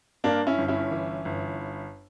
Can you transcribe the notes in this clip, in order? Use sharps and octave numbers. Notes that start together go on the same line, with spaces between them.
G2 A#3 D4
C#4 E4
G1
C#4 E4
E3
G1